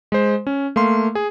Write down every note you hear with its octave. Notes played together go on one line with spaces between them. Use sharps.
G#3 C5
C#4
A3 A#3 F5 C6
G#4